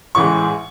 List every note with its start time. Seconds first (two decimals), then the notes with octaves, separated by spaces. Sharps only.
0.15 A1 A2 E3 G#3 C#6